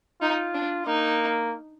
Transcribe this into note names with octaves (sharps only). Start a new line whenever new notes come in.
D#4 F4
D4
A#3 D#4